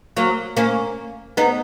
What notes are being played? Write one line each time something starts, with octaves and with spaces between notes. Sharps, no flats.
F#3 A#3
A#3 C#4
B3 D#4